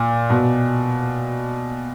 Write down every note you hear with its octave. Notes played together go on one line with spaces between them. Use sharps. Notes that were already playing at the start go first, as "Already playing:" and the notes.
Already playing: A#2
B2